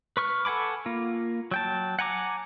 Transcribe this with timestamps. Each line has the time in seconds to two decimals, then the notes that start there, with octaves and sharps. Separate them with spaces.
0.17 B4 C#6 F6
0.45 A4 F#5 G#5 B5 D6
0.86 A#3 F4
1.51 F#3 G5 A5
1.99 F#5 G#5 A#5 D6